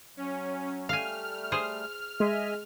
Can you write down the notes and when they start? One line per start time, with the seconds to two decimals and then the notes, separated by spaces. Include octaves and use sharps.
0.17 F#3 C#4
0.89 G3 A3 F5 G#5 F6
1.52 G#4 C5
2.20 G#3 D#5 E5 G#5